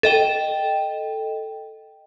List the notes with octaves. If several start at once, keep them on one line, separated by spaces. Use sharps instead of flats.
A4 D#5 G5